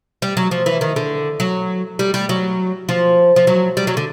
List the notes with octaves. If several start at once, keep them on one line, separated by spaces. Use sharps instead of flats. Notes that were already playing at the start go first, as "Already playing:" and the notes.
G3
F#3
F3
E3
D#3
D3
F#3
G3
G3
F#3
F3
F3
F#3
G3
F#3
D3